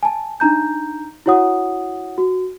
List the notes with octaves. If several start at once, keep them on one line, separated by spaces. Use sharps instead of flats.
G#5 A5
D4 D#4 A#5 G6
E4 F#4 C#5 F#5 D#6
F#4